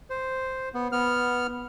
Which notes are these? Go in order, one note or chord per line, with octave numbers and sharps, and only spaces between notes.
C5
B3
B3 F6